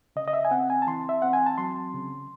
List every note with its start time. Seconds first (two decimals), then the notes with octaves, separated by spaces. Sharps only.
0.16 C#3 D#5
0.28 D#5
0.33 E5
0.45 G#5
0.51 C4 F#5
0.70 G#5
0.82 A5
0.87 E3 C6
1.09 E5
1.22 C4 F#5
1.33 G#5
1.46 A5
1.58 F#3 C6
1.94 C#3